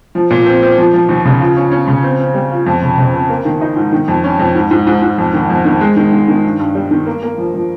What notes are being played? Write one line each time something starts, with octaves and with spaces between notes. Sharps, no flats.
F3
A#2
C4
C4
F3
F3
D#2
C#3
F4
C#4
C#4
C#3
C4
C4
G3
F4
F2
C#3
C#3
C4
A#3
D#3
D#4
G#2
D#3
F2
C#4
F2
G#2
G#2
G#2
G#2
F2
D#3
F2
D#3
G#3
D#3
D#3
D#3
G2
G2
G3
D#3
A#3
A#3
F3
F3